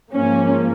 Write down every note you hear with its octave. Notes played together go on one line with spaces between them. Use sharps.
G#2 F3 A#3 C#4